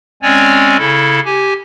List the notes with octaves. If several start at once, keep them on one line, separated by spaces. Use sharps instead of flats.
G#3 C4 C#4 C#5 D5 G#5
C#3 E4 A4
G4 G#5